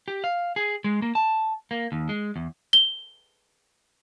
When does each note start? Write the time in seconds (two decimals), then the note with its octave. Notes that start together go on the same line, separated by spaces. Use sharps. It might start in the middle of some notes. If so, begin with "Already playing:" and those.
0.08 G4
0.24 F5
0.56 G#4
0.84 G#3
1.02 A#3
1.15 A5
1.71 A#3
1.92 D#2
2.09 G#3
2.36 E2
2.73 G7